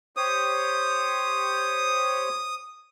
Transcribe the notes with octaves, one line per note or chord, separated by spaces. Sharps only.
G4 C5 C#5 D#6